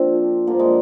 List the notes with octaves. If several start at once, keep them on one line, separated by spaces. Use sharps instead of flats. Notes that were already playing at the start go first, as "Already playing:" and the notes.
Already playing: A#2 F3 C4 D4
G2 D3 F3 A#3
G#3